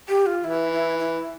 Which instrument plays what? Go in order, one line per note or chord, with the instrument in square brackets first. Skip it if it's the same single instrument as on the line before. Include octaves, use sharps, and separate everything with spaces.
[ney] G4
F4
[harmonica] E3 [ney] E4
[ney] E4
E4